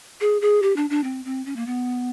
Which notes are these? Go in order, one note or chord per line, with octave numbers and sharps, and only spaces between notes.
G#4
G#4
G4
D4
D4
C4
C4
C#4
A#3
B3